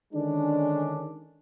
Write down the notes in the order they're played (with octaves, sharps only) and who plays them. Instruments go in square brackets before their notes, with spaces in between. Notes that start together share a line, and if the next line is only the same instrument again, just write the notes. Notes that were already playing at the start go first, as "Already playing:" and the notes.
[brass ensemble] D3 D#3 G#3 C#4 D4